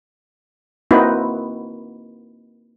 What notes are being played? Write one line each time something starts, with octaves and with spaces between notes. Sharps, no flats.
A#3 C4 D#4 E4 F#4 B4